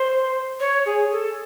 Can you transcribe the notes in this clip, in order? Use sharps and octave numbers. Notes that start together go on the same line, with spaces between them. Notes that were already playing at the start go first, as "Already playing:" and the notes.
Already playing: C5
C#5
G#4
A4